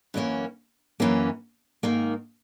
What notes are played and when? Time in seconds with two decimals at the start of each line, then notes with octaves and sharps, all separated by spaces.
0.14 F#2 E3 A#3 C#4
1.00 F#2 E3 A#3 C#4
1.83 G#2 D#3 A#3